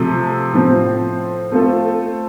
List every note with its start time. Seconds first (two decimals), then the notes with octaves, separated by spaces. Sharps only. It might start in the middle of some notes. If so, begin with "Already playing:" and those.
Already playing: C3 F3 A3
0.53 A2 F3 C4
1.52 A3 C4 F4 A4